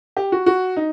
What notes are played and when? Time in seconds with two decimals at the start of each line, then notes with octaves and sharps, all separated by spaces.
0.17 G4
0.32 F#4
0.46 F#4
0.77 D#4